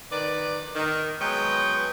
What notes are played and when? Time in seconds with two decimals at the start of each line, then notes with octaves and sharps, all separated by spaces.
0.12 D#3 B4 D5
0.76 D#3
1.21 F#3 G#3 B3 B4 C#5 G5